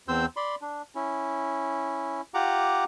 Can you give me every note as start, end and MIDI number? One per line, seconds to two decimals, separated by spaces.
0.08 0.26 40
0.08 0.26 60
0.08 0.26 72
0.08 0.26 88
0.08 0.26 91
0.37 0.55 74
0.37 0.55 83
0.37 0.55 84
0.62 0.82 62
0.95 2.21 61
0.95 2.21 64
2.34 2.84 65
2.34 2.84 67
2.34 2.84 78
2.34 2.84 82
2.34 2.84 86